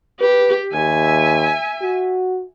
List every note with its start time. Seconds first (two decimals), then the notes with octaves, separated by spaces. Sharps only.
0.21 G4 B4
0.73 D#2 E5 G#5
1.82 F#4